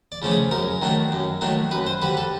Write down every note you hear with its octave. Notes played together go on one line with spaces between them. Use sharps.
D5
C#3 F3 A3 C#4
G#4
F#2 A#4
D#3 F#3 A3 D4
F#2
D#3 F#3 A3 D4
F#2 B4
C5
D3 G3 B4
A4